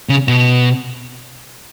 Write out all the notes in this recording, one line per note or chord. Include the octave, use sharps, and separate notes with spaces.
C#3
B2